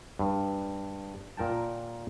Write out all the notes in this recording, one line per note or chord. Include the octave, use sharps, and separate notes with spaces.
G2
A#2 A#4 G5 A5